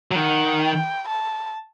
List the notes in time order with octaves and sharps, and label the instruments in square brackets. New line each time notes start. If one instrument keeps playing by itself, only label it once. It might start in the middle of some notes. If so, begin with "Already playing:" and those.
[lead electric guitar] F#3
[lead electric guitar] D#3 [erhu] F#5
[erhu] G5
A5